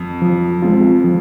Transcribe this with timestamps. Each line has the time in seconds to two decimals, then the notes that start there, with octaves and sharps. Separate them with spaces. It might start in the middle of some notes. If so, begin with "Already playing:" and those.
Already playing: F2
0.22 F3
0.62 G#3 C4 F4
1.04 F3